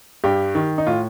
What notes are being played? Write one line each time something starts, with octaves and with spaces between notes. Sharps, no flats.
G2 G4
D#3
D#4
A2 F4